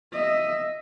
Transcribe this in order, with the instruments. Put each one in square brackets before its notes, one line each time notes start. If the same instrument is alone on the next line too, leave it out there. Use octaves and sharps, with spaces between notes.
[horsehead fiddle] D#5 E5